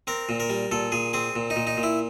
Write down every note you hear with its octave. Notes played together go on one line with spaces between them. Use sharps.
C4 A#4
A#2
A#4
G3
A#2 A4
A#2 G#4
C4 G#4
A#2
D#4
A#2
D#4
A#2
E4